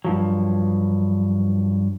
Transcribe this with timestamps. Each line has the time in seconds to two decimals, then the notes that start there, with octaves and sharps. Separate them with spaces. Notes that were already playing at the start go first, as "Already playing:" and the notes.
0.05 G2 F3 F#3